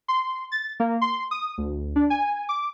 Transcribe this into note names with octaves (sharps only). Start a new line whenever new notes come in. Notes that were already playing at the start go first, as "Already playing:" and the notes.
C6
A6
A#3
C6
D#6
D2
D4
G#5
D6